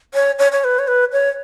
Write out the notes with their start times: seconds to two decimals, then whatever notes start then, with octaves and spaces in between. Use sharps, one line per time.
0.14 C#5
0.39 C#5
0.52 C#5
0.64 B4
0.79 C#5
0.88 B4
1.12 C#5